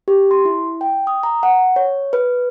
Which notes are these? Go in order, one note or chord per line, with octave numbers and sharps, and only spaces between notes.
G4
C6
E4
G5
D#6
A#5
F#5
C#5
B4